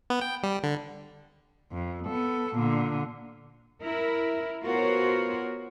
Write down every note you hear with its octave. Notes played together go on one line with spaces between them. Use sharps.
B3
G5
G3
D3
F2
B3 A4
A#2 D3
E4 A#4
B3 F4 F#4 A#4 C5 C#5